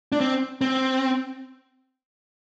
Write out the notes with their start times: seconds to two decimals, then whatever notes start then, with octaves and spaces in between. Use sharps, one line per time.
0.12 D4
0.21 C4
0.61 C4